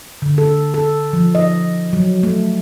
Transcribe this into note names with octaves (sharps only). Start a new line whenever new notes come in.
D3
A4
A4
F3
D#5
F#3
A3